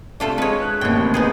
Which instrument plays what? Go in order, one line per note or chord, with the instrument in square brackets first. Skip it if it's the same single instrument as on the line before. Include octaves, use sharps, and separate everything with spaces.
[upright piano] C3 A3 [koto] D4 F4 A4
[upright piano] G#3 [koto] B4 C#5
[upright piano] F#6
[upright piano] A1 D#2 C3 [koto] C#5 G5
[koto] B3 D#4 G#4